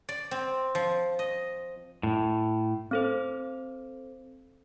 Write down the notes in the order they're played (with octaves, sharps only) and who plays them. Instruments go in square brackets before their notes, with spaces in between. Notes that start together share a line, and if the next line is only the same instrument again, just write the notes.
[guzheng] D5
C4
F3
D#5
[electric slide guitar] A2
[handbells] C4 A4 C5